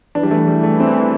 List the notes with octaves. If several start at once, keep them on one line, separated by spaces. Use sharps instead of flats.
E3 D4
G3
A3
G3
A3
C4